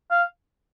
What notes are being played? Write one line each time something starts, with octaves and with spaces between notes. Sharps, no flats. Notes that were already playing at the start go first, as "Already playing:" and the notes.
F5